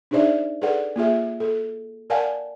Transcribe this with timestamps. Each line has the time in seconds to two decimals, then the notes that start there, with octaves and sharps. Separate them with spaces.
0.11 D4 D#4 G#4 C5 D5 E5
0.62 G#4 A4 B4 D5 F#5
0.96 A#3 F4 G#4 E5
1.40 A4
2.10 A#4 D5 F5 F#5 G#5 A5